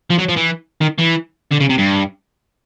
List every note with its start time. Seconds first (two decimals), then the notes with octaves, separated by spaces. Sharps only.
0.10 F3
0.19 F#3
0.29 F3
0.37 E3
0.81 D#3
0.99 E3
1.52 D3
1.61 C#3
1.70 C3
1.79 G2